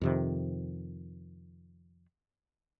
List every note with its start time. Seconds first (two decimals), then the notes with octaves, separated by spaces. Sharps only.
0.01 F2 C3 D#3